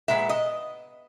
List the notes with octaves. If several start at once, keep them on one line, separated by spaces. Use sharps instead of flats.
A#2 G#3 B3 E5
D#5